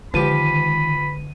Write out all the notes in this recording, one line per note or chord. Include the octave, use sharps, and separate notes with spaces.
D3 D#3 F3 G4 B5 D#7